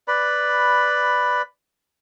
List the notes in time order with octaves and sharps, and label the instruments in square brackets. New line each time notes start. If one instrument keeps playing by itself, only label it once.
[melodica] B4 D5 B5